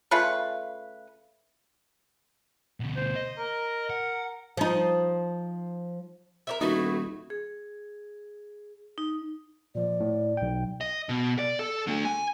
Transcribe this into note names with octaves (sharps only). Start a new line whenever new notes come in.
C#3 A3 F4 B4
D2 B2
C5
D#5
A#4
F#5
F3 D#4
A#4 D5 E5
D#1 A3 B3 D#4 E4 F#4
G#4
D#4
A#2 F3 D5
A2
B1 G5
D#5
B2
D5
A4
D3 A3
G#5